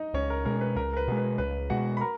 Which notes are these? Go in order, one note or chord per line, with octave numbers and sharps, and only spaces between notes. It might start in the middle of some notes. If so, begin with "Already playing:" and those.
Already playing: D#4 D#5
C#2 C#4 C#5
A#4
B2 G#3 A#4
B4
C#2 A#4
A#4
B4
B2 G#3
B4
C#2 B4
B2 G#3 F#4 F#5
B5
A#4 A#5